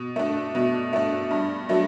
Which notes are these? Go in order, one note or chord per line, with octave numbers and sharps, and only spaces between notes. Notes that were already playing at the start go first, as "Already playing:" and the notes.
Already playing: B2
A3 D4
B2
A3 D4
G2
F#3 A3 D4